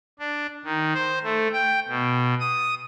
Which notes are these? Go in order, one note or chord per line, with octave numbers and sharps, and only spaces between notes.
D4
D#3
C5
A3
G5
B2
D#6